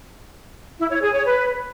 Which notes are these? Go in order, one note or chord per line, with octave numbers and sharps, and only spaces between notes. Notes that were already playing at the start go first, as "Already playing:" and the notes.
E4
C#5
G#4
C#5
B4